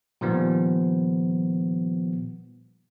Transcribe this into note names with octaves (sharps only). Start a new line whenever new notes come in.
A#2 D#3 F3 G3 B3